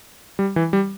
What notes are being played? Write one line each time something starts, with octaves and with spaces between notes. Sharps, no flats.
G3
E3
G3